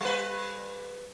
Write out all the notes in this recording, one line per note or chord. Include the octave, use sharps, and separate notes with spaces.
G3 B4